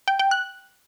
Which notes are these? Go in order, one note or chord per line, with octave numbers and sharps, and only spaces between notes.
G5
G5
F#6